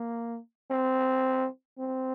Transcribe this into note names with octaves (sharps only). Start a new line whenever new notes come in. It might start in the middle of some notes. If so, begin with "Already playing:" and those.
Already playing: A#3
C4
C4